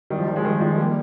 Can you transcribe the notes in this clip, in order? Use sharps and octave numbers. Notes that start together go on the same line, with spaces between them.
D#3 G3
F3
D#3 G3
F3 G#3
D#3 G3
F3 G#3
G3 A#3